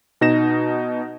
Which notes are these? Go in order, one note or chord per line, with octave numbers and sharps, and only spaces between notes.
B2 D#4 A#6 E7